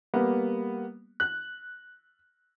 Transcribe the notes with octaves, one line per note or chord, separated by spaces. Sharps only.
G3 A#3 B3
F#6